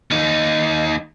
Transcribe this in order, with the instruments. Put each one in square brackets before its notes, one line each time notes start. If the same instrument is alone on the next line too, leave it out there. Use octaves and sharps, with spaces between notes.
[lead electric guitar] D#2 D#4